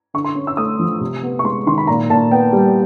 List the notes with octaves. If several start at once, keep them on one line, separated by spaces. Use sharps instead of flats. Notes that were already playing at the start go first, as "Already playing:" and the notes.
D3 C#6
C6
C#4
E6
A3 D#6
F3
C3
B3
C#6
G#3 C6
D#3 C6
B5
A#2 A#5
A#2 A5
B3 G5
G3